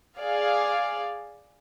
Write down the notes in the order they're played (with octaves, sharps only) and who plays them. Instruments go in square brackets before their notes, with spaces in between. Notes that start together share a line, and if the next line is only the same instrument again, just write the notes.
[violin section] G#4 D5 F5